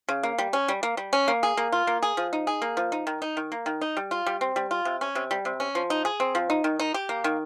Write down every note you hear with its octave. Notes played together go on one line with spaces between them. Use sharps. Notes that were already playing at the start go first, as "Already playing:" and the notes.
C#3
A#3
G3
C#4
G3
A#3
G3
C#4
A#3
G#4
A#3
F4
A#3
G#4
F3
D#4
G#4
A#3
F3
D#4
D#3
D#4
D#3
A#3
D#3
D#4
G3
F4
G3
C4
G3
F4
C3
C#4
C3
G3
C3
C#4
F3
D#4
G#4
C4
F3
D#4
D#3
D#4
G4
A#3
D#3